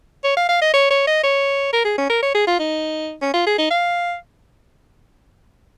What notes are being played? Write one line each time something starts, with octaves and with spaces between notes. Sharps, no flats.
C#5
F5
F5
D#5
C#5
C#5
D#5
C#5
A#4
G#4
C#4
A#4
C#5
G#4
F4
D#4
C#4
F4
G#4
D#4
F5